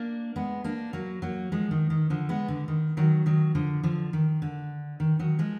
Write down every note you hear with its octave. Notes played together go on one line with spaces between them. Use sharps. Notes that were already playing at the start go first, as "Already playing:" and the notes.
Already playing: A#3 D4
G#3 B3
A#3 D4
F#3 A#3
F#3 A#3
F3 G#3
D#3
D#3
D3 F3
G#3 B3
D3
D#3
D#3 F#3
D#3 F#3
D3 F3
D3 F3
D#3
D3
D#3
D#3 F#3
F3 G#3